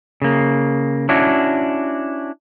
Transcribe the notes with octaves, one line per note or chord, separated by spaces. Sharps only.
C#3 A#3
C#4 D4 E4 F#4